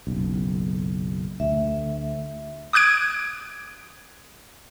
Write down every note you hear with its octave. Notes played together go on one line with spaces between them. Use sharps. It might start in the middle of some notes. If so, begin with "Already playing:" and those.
F#1 B1
D2 E5
D6 D#6 F#6 G#6 D7